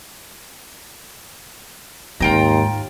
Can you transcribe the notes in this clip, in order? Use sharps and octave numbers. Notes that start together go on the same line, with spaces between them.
D#2 G#2 F4 G5 A#5